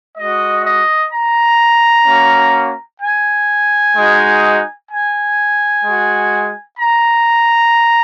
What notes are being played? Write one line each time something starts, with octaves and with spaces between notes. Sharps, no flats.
G#3 F#4 D#5
D#5
A#5
A#3 C#4 F#4
G#5
G#3 D#4 F#4
G#5
G#3 F#4
A#5